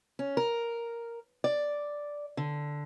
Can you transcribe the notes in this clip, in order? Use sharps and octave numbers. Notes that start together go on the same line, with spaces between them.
C#4
A#4
D5
D3